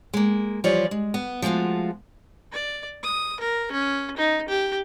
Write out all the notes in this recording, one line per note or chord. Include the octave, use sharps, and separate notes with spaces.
G#3 A#3
E3 F3 G3 F4 C#5 D5
G#3
B3
F3 G#3 A3 F4 F#4
D5
D#6
A#4
C#4
D#4
G4